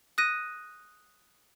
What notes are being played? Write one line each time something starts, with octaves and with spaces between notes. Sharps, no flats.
D#6 F#6 A#6 D#7